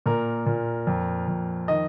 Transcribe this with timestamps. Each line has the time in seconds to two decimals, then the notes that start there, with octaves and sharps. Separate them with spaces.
0.06 A#2 A#4
0.46 A#2
0.87 F2
1.28 F2
1.68 D#3 D#5